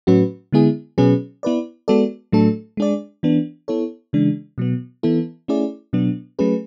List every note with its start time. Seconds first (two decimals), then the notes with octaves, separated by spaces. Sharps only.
0.07 A2 F#3 C#4 F#4 B4
0.52 D3 G#3 B3 E4 G#4
0.98 B2 F#3 C#4 G#4 B4
1.43 B3 E4 B4 D5
1.88 G#3 B3 F#4 A4 D5
2.32 A2 F#3 A3 D4 A4
2.77 G#3 D4 G#4 D5
3.23 E3 B3 D4
3.68 B3 E4 A4 C#5
4.13 C#3 E3 G#3 D4
4.58 B2 F#3 B3
5.03 E3 B3 E4 A4
5.48 A3 C#4 E4 G#4 D5
5.93 B2 F#3 B3 D4
6.39 F#3 A3 C#4 G#4 B4